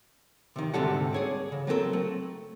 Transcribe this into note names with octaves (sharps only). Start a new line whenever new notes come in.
C3 D#3
D2 G#2 C3 G3 A4 F#5
G#4 C#5 D5
C#3
F#3 B3 C4 A4 A#4
A3